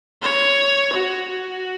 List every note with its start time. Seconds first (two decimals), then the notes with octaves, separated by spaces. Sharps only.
0.22 C#5
0.92 F#4
1.29 F#4